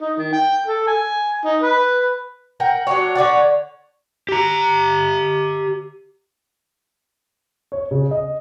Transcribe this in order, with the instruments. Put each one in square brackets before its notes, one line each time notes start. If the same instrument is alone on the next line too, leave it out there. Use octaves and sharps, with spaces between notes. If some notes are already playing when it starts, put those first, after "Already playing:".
[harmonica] D#4
D#3
G5
A4
G#5
D#4
B4
[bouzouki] A#4 F#5 G5
F#3 D4 C#5
D3 C#5 D5 F#5
[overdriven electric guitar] G4 A#5
[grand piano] C#5
C#3
D#5